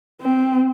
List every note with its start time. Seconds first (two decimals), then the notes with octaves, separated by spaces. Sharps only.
0.21 C4